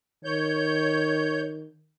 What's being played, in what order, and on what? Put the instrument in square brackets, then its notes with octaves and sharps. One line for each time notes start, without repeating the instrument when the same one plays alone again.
[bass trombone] D#3 [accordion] C#5 G6